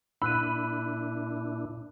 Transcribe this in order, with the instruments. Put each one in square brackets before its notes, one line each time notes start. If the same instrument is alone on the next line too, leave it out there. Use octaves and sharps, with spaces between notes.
[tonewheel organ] A#2 D4 E4 [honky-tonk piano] B5 [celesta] E6 F#6 D#7